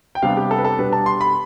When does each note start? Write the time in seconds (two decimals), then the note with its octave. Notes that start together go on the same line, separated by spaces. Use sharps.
0.15 G5
0.22 C3 G3 B3 D4 F5
0.37 G4
0.51 A4
0.58 B4
0.65 A4
0.79 B2 G3 B3 D4 B4
0.93 A5
1.06 C6
1.21 B5